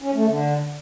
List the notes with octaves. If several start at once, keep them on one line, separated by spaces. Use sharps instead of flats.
C#4
A3
D3